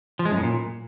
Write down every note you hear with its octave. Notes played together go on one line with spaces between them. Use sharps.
F3
G#3
F#2
A2
A#2